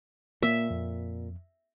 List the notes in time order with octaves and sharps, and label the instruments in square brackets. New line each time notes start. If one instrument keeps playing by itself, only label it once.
[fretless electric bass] A#2 [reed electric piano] A#3 [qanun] E5
[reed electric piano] F2